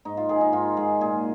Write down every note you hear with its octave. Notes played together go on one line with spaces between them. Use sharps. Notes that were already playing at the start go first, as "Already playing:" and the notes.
G#2 D#4
F4
D#3 G#4
D#4
G#2 F4
G#2 G#4
A#2 G#4